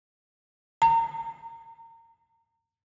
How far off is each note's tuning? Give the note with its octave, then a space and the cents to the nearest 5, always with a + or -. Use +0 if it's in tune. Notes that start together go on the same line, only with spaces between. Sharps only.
A#5 -30